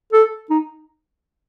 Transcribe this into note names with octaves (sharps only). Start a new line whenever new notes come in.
A4
D#4